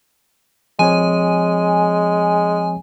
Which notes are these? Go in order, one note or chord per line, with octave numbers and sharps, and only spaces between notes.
F3 G#3 C4 C#5 G#5